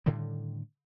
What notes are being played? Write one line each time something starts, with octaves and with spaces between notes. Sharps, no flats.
A2 D3 D#3 G3